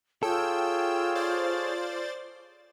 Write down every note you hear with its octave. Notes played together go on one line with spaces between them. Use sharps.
F4 G#4 A4 C#5 G5 E6
C5 D5 A6